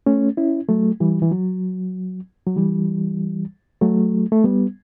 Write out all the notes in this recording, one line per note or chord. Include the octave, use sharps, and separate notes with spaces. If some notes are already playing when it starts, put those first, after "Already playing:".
A3 C#4
C#4 E4
F#3 A3
E3 G3
E3
F#3
F#3
E3 G3
F#3 A3
A3
G3 B3